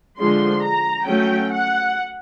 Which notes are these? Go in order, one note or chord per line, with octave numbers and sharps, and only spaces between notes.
D3 F3 G#3 C6
A#5
F#3 A3 C#4 G5
F#5